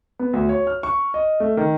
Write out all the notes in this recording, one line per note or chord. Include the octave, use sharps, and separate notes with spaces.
B3
D2
C#5
F6
C#6
D#5
A3
D#3